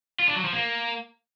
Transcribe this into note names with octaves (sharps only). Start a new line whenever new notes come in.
F4
D4
F#3
F3
A#3